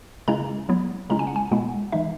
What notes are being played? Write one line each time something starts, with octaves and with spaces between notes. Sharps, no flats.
C#3 G#3 C#4 E4 A#5
F#3 B3 E4
C#3 G#3 C#4 E4 A#5
G#5
F#5
G#5
B2 G#3 B3 E4 F#5
E3 G#3 D#4 E5